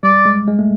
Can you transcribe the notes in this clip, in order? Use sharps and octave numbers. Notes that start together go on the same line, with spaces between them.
G3 D5
G#3
G#3
A3